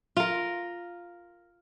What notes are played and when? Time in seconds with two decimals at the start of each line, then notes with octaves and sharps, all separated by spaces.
0.17 F4 A#4